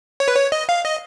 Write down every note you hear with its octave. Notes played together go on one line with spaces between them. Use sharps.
C#5
B4
C#5
D#5
F5
D#5